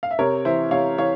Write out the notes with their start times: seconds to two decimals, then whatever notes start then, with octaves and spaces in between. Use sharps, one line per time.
0.03 F5
0.11 E5
0.19 C3 A#4 C#5
0.45 E3 C5 E5
0.71 C3 C#5 F5
0.98 E3 C#5 F5